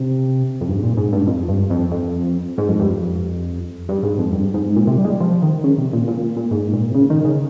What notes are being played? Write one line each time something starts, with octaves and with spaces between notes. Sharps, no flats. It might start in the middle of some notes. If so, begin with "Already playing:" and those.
Already playing: C3
F2
G2
G#2
A#2
G#2
G2
F2
G2
F2
F2
G#2
F2
G2
F2
G2
G#2
F2
G2
G#2
A#2
C3
G3
G#3
G3
F3
D#3
C#3
C3
A#2
A#2
A#2
G#2
A#2
C3
C#3
D#3
C#3